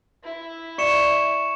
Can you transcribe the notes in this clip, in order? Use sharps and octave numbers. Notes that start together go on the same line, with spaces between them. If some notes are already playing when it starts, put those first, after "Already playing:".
E4
D5 C#6 C#7 E7